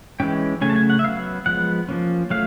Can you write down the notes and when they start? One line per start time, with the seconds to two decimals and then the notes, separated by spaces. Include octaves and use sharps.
0.20 E3 G#3 C#4 G5
0.61 C#3 F#3 A3 C#4 G#5
0.70 A5
0.76 G#5
0.90 F#5
0.99 E5
1.04 F#3 B3 F5
1.46 F3 G#3 B3 F#5
1.89 F3 A#3 C#4
2.30 F#3 A3 F5